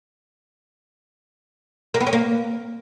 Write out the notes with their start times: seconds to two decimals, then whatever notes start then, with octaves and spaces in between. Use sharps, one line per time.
1.94 A#3
2.00 B3
2.07 C#4
2.13 A#3